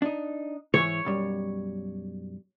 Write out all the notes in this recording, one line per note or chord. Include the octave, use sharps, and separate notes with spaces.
D4 D#4
G#2 E3 C#5
B1 F#2 G3